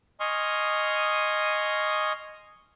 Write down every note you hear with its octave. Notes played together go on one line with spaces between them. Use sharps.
D#5 G#5 C6 C#6 D#6 F6